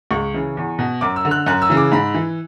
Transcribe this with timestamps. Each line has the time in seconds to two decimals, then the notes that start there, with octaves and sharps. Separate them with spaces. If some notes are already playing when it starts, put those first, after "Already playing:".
0.11 C#2 C#6
0.34 C#3 E3
0.57 E2
0.79 B2
1.01 F#2 D6
1.16 E6
1.25 D3
1.31 F#6
1.46 F#2 F#6
1.62 E6
1.70 C#3 E3
1.77 D6
1.92 G#2 B5
2.14 E3